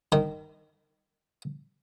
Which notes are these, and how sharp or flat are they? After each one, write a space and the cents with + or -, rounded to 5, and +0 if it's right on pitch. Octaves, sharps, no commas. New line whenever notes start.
D#3 -15